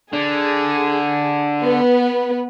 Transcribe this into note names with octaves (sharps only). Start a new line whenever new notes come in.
D3 G#4
B3 B4